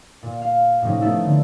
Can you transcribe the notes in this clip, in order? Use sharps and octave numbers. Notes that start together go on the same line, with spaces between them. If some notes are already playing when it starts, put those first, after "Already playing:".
A#2
F5
A2 C3 F3 C#4 D#4
A3 B3 D#4 E4 A4
D3